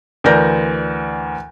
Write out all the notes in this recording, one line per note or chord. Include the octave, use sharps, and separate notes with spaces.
D2 E3 A#4 D5 G6 A#6